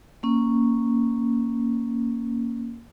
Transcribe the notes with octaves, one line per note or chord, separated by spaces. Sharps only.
A#3 C#4